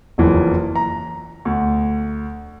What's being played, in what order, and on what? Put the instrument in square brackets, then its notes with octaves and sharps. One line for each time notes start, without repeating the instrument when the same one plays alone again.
[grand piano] F#1 F2 E3 F4
A#5
D2